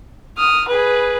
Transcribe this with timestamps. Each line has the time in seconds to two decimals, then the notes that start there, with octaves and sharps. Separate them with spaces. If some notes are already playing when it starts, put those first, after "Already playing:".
0.37 D#6 F6
0.68 G#4 B4